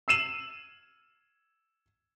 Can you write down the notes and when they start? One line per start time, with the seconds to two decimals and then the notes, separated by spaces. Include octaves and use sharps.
0.08 E6 C7 D#7 E7 F#7